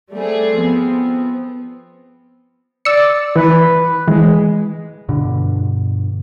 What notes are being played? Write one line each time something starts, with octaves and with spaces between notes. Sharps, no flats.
G3 A3 C4 G#4
F3 B3 C4
D5 E6 C#7
E3 B4
E3 G#3
G2 B2 D3